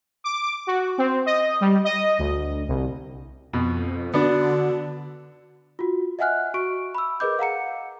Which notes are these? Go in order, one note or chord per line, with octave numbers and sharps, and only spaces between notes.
D6
F#4
C4
D#5
G3
D#5
D2
C2
F2 B2
D3 B3 D4 F#4
F4 F#4
D#5 E5 F#5 G#5 F6 F#6
F#4 C#6 D7
B5 E6
G#4 A#4 B4 D#5 D6 G6
F5 F#5 A#5 C#7